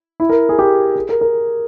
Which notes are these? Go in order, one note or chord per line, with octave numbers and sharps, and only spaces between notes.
E4
A#4
G#4
G4
G#4
A#4
A#4